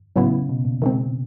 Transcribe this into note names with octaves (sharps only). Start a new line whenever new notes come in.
A2 C#3 F#3 B3 E4
B2
A#2
D#3 G#3 C4